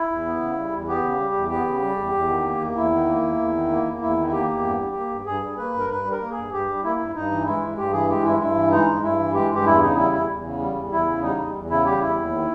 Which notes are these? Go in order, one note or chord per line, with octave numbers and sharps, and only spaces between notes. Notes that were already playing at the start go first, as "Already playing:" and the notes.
Already playing: E4
E2
B3
C#3
G3
E2
B3 G4
C#3
G3
E2
B3 G4
C#3
G3
E2
E2
D#3
A#3
E2
E2 E4
D#3
A#3
E2
E2
D#3
A#3
E2
E2 E4
D#3
E4
A#3 G4
E2
G2
G3
A#3
G2
G2 G#4
G3
A#3 B4
G2 A#4
G2 B4
G3
A#4
A#3
G#4
G2
G2 G4
G3
A#3 E4
G2
G2 D#4
E3
G#3 E4
G2
G2 G4
E3 G#4
G#3 G4
G2 E4
G2 E4
E3
G#3 D#4
G2
G2 E4
E3
G#3 G4
G2 G4
E2 E4
C#3 D#4
G3 E4
E2 E4
E2
C#3
G3
E2
E2 E4
C#3
G3 D#4
E2
E2
C#3 E4
G3 G4
E2 E4
D#2
D#3